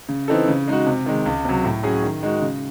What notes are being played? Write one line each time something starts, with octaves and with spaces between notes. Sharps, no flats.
C#3
E3 C4 D#4 A4
C#3
G#3 D#4 F#4
C3
D#3 G#3
C#2
C3 F#3
A2
F#3 C#4 G#4
D#3
G#3 D#4 F#4
C#3